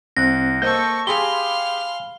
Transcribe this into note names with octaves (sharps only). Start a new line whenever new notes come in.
C2 C4 F#6 A#6
A#3 A4 C5 D#5 C#6 G6
G4 G#4 F5 G#5 B5 C6 G7